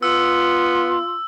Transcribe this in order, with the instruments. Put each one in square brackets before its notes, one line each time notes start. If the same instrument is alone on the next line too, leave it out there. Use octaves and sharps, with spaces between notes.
[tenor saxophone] B3 [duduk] F4 [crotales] E6